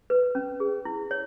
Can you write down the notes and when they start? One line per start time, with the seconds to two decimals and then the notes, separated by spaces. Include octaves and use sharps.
0.10 B4
0.35 C#4
0.60 G#4
0.85 E4
1.11 C#5